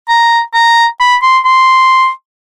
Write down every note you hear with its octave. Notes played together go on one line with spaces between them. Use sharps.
A#5
A#5
B5
C6
C6